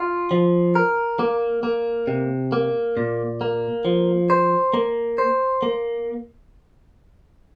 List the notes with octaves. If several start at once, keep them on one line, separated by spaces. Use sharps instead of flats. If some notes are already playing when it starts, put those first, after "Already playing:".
Already playing: F4
F3
A#4
A#3
A#3
C3
A#3
A#2
A#3
F3
C5
A#3
C5
A#3